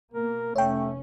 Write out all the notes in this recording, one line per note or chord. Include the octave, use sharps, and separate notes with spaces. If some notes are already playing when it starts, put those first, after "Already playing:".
B2 A#3 A#4
F1 A3 C#4 C#5 G5